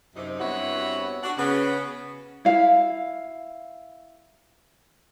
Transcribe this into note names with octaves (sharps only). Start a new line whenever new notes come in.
F#2 C3 D#4
G2 B3 C4 E4 F#4 C#5
D4 F#4
C#3 B3 C#4
E4 F5